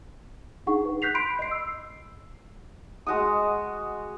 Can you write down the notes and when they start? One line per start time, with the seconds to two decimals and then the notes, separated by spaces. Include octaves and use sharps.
0.66 D4 D#4 G#4 F#5 C#6
0.85 B4
1.02 F#6 G6 B6 C7 F7
1.14 B5 C6 D7
1.39 D#5 C7
1.51 E6
3.06 G#3 F#4 F#5 D#6